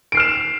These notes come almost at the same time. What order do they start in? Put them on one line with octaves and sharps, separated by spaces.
D7 C7 F6 E7